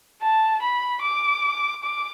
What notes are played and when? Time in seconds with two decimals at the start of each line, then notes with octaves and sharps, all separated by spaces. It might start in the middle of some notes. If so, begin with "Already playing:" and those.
0.22 A5
0.62 B5
1.03 D6
1.83 D6